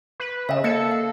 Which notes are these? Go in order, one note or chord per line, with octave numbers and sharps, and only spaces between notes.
B4
C#3 D#5 E5
A#3 A4 D#5 C#7
F5